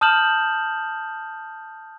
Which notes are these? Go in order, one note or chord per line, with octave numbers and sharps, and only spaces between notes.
A5 D#6 F6 G6 E7 F#7